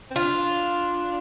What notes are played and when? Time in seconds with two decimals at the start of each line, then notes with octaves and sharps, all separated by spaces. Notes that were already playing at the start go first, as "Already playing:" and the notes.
0.11 C4
0.16 D4 F4